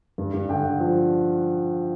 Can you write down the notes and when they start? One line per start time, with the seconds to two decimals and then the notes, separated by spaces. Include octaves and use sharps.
0.18 G2
0.34 G2
0.49 D3 G5
0.65 D3
0.80 F3